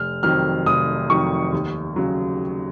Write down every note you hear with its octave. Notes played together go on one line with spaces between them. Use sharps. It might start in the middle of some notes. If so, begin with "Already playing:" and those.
Already playing: F1 F6
F2 D#3 F#3 F6
F1 D#6
F2 D#3 F#3 C#6
D#2
C#3 F#3